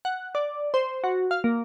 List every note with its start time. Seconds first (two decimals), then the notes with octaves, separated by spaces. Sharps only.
0.05 F#5
0.35 D5
0.74 C5
1.04 F#4
1.31 F5
1.44 A#3